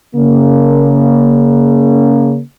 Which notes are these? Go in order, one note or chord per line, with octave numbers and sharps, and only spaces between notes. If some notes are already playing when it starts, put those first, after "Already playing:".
C#3 A#3